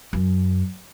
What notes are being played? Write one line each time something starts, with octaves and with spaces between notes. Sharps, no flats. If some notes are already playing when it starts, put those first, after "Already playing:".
F#2